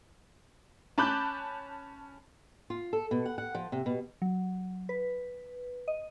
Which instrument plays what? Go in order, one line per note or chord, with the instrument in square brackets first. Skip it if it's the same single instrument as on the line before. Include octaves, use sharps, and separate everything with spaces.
[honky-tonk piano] C#4 A5 B5 D6 F#6 G6
[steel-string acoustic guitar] F4
A4
B2
F#5
F#5
F3
C3
B2
[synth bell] F#3
B4
D#5